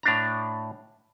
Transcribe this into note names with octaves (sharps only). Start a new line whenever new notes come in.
A2 D4 A#5